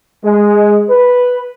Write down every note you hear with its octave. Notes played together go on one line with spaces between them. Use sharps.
G#3
B4